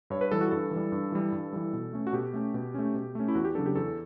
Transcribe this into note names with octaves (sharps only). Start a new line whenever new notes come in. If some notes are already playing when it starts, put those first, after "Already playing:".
G2 C#5
B4
E3 G3 A4
F#4
G2 A4
E3 G3
G2
E3 G3
G2
E3 G3
B2
A3 C#4
F#4
B2 G4
A3 C#4
B2
A3 C#4
B2
A3 C#4
E4
E2 F#4
G4
C#3 F#3 B3 D4 A4
G4
E2 A4